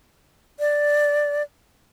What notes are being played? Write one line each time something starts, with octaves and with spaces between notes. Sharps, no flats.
D5